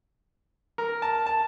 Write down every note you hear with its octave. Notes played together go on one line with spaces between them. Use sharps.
A#4
A5
A5